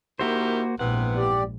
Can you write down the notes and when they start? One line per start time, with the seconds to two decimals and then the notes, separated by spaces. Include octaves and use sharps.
0.19 D#3 A#3 E4 F#4 G4 C5
0.79 A#1 G#2 C3 E3 B3 F#5
1.16 G4 D5